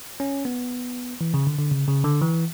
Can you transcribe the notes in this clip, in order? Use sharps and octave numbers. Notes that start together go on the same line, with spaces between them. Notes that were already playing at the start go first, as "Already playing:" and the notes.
C#4
B3
E3
C#3
D3
D3
C#3
C#3
D3
E3